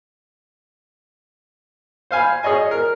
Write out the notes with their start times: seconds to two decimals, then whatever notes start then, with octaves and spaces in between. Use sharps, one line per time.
2.11 C5 F5 G#5 B5
2.43 G#4 C#5 D#5 G#5
2.71 A#4